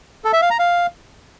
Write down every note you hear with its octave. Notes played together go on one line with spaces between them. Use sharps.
A4
E5
F5
A#5
F5